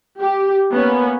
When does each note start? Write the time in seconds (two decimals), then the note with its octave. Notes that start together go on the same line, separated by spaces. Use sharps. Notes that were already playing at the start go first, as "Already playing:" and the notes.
0.20 G4
0.72 A#3 B3 C#4